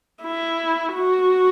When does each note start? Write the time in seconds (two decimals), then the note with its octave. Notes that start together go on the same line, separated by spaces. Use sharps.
0.22 E4
0.94 F#4